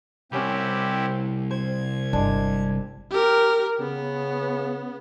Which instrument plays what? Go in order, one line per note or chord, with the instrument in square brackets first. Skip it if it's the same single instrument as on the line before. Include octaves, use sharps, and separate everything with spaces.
[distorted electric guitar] C2 [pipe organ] C3 E4 G4 [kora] B3 C#4
[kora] C5 [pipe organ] G#6
[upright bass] G1 [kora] G#3 D4
[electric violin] G4 A#4
[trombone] C#3 [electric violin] B3